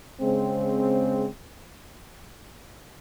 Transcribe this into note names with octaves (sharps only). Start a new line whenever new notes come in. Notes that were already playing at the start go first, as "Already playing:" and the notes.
C#3 G#3 C4